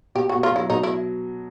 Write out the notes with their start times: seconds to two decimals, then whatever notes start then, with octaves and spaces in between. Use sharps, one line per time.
0.15 B2 G4
0.29 B2 F#4
0.43 F4
0.52 F#3 E4
0.70 B2 D#4
0.83 E4